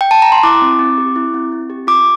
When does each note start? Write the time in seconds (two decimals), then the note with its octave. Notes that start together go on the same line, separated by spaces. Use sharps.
0.01 G5
0.11 A5
0.22 A#5
0.32 C6
0.43 E4 D6
0.62 C4
0.79 C4
0.98 G4
1.16 E4
1.34 C4
1.52 C4
1.70 G4
1.87 F4 D6